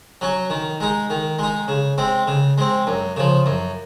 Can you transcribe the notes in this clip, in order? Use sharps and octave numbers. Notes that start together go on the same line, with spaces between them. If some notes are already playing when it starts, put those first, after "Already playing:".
F#3 C#4
D#3
G#3 D#4
D#3
G#3 D#4
C#3
G#3 C4
C#3
G#3 C4
F#2
C#3 F3
F#2